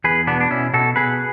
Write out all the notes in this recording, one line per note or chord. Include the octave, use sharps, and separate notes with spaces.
E2 G#4 B4
B2 B3 D4
D4
B2 C#4 E4
B2 F#4 A4
B2 G#4 B4